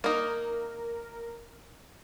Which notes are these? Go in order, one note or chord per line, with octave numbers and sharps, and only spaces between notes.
A#3 D#4 A#4